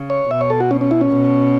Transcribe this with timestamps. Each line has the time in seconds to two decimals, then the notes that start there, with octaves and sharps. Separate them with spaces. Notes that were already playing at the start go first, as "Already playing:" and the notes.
Already playing: C#3
0.10 C#5
0.30 B2 E5
0.41 C#5
0.50 A4
0.60 F#4
0.71 C#4
0.81 C#4
0.91 E4
1.01 C#4
1.11 B2